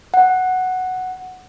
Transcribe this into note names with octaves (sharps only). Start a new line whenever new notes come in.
F#5